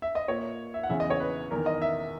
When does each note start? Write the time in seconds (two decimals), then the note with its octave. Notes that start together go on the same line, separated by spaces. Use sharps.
0.02 E5
0.15 D#5
0.28 A#2 C#5
0.74 E5
0.83 F#5
0.89 E2 C#3 E3 E5
1.00 D#5
1.10 C#5
1.20 B4
1.51 E2 D#3 A#4
1.66 D#5
1.82 E5